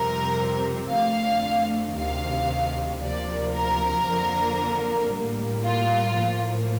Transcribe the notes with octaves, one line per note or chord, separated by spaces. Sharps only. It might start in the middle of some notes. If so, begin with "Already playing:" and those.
Already playing: F2 C3 G3 C4 A#4
F2 D3 A3 F5
D2 C3 D#3 F5
D2 C3 F3 A#3 D5
A#4
F2 D3 F3 A#3
A2 G3 A#3
F4
A2 F3 A#3